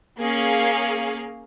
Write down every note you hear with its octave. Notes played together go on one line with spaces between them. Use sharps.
A#3 C#4 G#4 F5